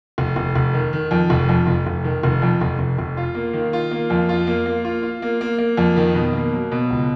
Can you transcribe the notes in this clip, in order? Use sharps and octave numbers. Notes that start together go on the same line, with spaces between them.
F1
F1
F1
D#3
D#3
F2
F1
F2
F1
F1
D#3
F1
F2
F1
F1
F1
F4
A#3
D#3
F4
A#3
F2
F4
A#3
A#3
F4
F4
A#3
A#3
A#3
F2
D#3
B2
A#3
F#3
B2
C#2